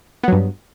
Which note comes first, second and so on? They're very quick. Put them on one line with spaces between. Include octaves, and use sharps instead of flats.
B3 F#3 G2